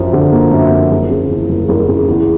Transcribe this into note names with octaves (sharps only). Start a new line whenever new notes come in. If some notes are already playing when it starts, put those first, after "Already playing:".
Already playing: F#2 F3
D3
A#3
F#2
F3
F#1
C#3
E2
F#1
F#1
C#3
E2